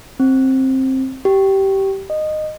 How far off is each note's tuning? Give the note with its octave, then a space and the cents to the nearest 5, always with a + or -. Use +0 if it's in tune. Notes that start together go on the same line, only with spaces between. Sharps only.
C4 +15
G4 -15
D#5 -15